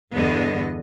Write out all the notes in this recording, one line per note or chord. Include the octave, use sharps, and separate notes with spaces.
E2 G2 D3 B3 D#5